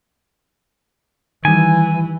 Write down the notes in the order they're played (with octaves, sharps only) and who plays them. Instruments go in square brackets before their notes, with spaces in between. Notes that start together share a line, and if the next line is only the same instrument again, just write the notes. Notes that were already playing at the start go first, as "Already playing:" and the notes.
[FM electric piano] D#3 G3 [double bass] E3 [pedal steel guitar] G#5